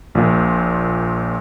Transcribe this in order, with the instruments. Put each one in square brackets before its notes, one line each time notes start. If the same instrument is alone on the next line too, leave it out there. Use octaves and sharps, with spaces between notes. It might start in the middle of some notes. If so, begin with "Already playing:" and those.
[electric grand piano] A#1 A#2